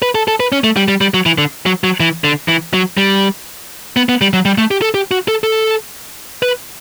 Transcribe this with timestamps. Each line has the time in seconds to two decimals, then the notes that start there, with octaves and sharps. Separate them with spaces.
0.02 B4
0.15 A4
0.28 A4
0.40 B4
0.52 C#4
0.64 A3
0.77 G3
0.88 G3
1.01 G3
1.14 F#3
1.26 E3
1.38 D3
1.66 F#3
1.84 F#3
2.00 E3
2.24 D3
2.48 E3
2.74 F#3
2.97 G3
3.97 B3
4.09 B3
4.21 G3
4.33 F#3
4.45 G3
4.58 A3
4.71 G4
4.82 A4
4.94 G4
5.11 F#4
5.28 A4
5.44 A4
6.43 B4